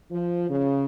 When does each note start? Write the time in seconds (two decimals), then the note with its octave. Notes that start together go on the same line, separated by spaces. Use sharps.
0.10 F3
0.49 C#3